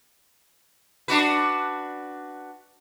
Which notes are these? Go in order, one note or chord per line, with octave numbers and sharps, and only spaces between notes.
D4 F#4 B4